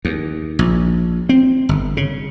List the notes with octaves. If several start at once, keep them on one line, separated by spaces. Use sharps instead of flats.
D#2
A#1
C4
G1
C#3